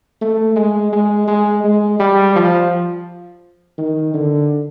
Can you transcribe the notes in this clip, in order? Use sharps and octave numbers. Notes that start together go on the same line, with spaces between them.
A3
G#3
G#3
G#3
G#3
G3
F3
D#3
D3